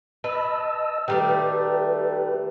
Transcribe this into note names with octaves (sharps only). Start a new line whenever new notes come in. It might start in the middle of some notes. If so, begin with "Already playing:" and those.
B4 D#5 A5 E6
D#3 G3 A3 G4 B4